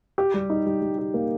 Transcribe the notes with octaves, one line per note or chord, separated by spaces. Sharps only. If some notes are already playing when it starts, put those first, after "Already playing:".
G4
G3
D#4
G3
G3
G4
A#3